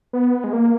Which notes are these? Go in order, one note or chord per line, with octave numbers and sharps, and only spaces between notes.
B3
G#3
A#3